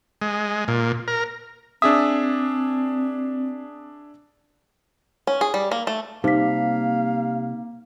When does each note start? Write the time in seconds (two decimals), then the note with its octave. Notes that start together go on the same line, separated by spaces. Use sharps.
0.22 G#3
0.68 A#2
1.08 A#4
1.82 C4 D4 G#4 E5 D#6
5.27 C#4
5.41 G#4
5.54 G3
5.71 A#3
5.87 A3
6.24 C3 G3 A#3 D#4 F5 B6